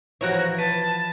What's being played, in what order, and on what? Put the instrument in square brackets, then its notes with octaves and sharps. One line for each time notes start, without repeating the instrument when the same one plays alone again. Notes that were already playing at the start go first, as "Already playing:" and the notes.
[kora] E3 F3 [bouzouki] F#4 A#4 C#5
[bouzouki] B4 [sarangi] A5